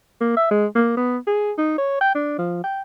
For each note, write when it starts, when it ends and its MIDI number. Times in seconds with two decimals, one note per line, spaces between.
0.21 0.33 58
0.37 0.46 76
0.51 0.66 56
0.75 0.93 58
0.97 1.18 59
1.27 1.52 68
1.58 1.74 63
1.78 1.97 73
2.01 2.13 79
2.15 2.37 62
2.38 2.62 53
2.64 2.82 79